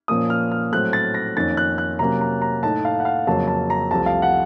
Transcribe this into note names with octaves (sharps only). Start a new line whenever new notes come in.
A#2 F3 A#3 C#4 D#6
F6
F6
A2 F#3 A3 C4 F#6
A6
A#6
F2 D#3 A#3 C#4 A6
F#6
F#6
C3 F#3 A#3 C#4 A#5
A#5
A#5
A2 A3 D#4 A5
F5
F#5
F5
F2 C#3 F#3 A#3 A5
A5
A#5
C2 C3 F3 A3 A5
F5
F#5